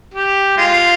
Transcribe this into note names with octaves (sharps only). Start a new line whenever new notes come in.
G4
G#3 F4